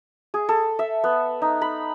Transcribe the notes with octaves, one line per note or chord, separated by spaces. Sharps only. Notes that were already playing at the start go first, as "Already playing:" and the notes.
G#4
A4
E5
B3
D#4
B5